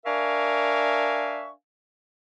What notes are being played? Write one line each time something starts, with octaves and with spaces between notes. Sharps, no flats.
D4 A#4 E5 F5 G#5 C#6